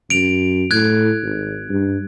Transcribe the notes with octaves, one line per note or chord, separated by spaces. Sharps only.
F#2 D7 F7
A2 F#6 G#6
G#1
G2